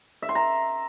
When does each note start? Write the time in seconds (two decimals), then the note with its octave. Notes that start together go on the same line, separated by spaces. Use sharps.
0.22 E5
0.29 C6
0.35 A#5